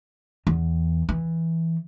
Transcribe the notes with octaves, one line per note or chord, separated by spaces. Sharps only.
E2
E3